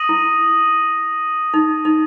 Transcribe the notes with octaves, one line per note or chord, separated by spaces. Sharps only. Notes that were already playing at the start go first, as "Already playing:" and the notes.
Already playing: D#6 A#6 D#7 F#7
E4
D#4
D#4